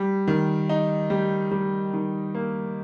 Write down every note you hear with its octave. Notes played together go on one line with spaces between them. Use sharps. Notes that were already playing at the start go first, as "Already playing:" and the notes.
Already playing: G3
D#3
D#4
G3
G3
D#3
A#3